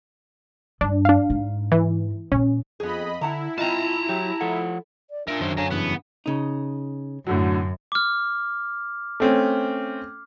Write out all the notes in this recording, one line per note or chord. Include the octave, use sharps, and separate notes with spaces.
G2 D4
D4 F5
G#2
E3
A#2 B3 C#4
F2 B3 G#4 D#5 B5
D3 E4 F#5 A5 A#5
G#3 C4 F4 A5 A#5
F#3 G4
F3 F4 A4 F#5
D5
D4 F4 A#4 E5
F#2 D#3 C5
D3 C#5 F5 G#5 A#5
G2 C#3 E3 B3 D4
C#3 D#4
F#2 A2 D3 F#3
D6 F6
A3 C4 C#4